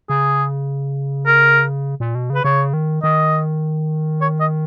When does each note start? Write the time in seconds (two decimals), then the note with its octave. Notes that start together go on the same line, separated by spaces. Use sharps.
0.09 C#3 G#4
1.27 A#4
2.00 A#2
2.15 B2
2.30 C#3 B4
2.44 C#3 C#5
2.73 D#3
3.03 D#3 D#5
4.21 C#5
4.40 D#5